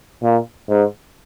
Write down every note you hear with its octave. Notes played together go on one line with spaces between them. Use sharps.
A#2
G#2